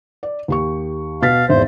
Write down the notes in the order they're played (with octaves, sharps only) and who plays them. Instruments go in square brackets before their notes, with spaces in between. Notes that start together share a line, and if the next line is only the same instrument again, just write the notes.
[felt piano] D5
D#2 G4 C#6
[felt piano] B2 A6 B6 [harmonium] F5
[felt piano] G#1 E5 [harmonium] E2 C5